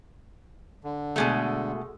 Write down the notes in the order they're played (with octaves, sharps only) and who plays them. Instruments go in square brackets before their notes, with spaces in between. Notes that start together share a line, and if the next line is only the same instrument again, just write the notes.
[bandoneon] D3
[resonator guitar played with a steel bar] B2 G#3 A3